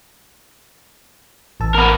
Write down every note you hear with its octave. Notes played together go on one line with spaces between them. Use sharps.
A1 A5 E6
B3 A#4